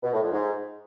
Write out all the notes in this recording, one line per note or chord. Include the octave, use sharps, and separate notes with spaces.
B2
A2
F2
G#2